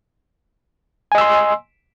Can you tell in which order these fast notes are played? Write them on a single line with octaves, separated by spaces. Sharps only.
G#5 D#5 E6 C6